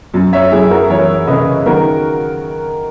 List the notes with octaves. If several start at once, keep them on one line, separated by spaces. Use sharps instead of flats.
F#2
C#5 E5
F#2 E4 G#4
F#4 A#4
E3 A#4 C#5
C#3 B4 D#5
D#3 F#4 A#4